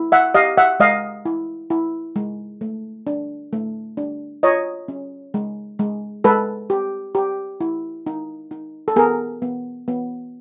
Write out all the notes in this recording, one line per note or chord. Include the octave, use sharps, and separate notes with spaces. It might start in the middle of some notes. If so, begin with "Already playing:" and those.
Already playing: E4
E5 F#5
G4 D#5 F5
E5 F#5
G#3 D#5 F5
E4
E4
G#3
A3
D4
A3
D4
F4 C#5 D#5
C#4
G#3
G#3
G#3 A4 B4
G4
G4
E4
D#4
D#4
A4
B3 G#4 A#4
B3
B3